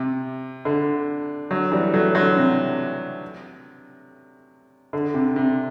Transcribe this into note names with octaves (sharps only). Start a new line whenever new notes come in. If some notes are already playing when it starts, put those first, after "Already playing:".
Already playing: C3
D3
D3 F#3
E3 G3
F#3 A3
D3 F#3
C3
D3
C3
C3